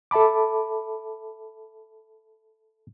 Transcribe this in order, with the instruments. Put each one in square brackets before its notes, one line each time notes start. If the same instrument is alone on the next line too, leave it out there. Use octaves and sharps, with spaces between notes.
[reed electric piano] A4 E5 A5 B5 D6